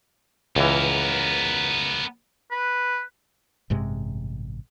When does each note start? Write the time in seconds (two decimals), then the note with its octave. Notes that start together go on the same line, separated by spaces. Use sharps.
0.56 C#2 E3 B3 A#4
2.51 B4
3.70 A1 G2 C3 G#3